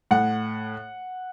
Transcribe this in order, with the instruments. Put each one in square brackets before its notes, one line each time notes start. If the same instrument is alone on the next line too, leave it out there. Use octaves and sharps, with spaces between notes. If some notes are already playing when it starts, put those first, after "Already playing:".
[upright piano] A2 F#5